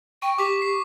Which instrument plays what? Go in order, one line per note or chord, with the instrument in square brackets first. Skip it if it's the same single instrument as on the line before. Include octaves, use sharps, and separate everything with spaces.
[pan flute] G5 [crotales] C#6
[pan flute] G4 [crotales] D6 B6
[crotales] C7